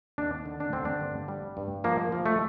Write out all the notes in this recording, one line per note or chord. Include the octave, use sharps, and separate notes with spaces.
D#2 D4
D3
D4
D3 C4
D4
G2
G3
G2
F3 A#3
F3
A3